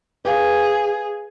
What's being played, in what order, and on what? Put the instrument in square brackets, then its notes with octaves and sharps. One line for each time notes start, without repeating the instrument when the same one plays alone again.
[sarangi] G#4 [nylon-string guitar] B4 F5